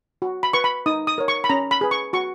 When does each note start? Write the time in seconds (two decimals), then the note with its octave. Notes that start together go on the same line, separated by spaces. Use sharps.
0.22 F#4
0.43 B5
0.53 B4 C#6
0.64 B5
0.86 D#4 D#6
1.07 D#6
1.18 A#4 C#5
1.28 C#6
1.44 B5
1.49 C#4 A#5
1.71 B5
1.81 G#4 B4
1.91 C#6
2.13 F#4 C#6